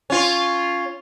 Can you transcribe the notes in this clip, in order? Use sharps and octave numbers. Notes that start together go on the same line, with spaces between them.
C#4 F4